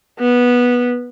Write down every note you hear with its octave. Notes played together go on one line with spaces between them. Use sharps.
B3